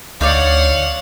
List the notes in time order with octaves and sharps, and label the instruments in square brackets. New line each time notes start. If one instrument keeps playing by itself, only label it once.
[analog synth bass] D2 [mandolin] D#4 C#5 D5 [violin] F5 F#5